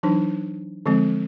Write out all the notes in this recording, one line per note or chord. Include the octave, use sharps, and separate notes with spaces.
E3 F#3 D4 D#4
D3 F3 G#3 C4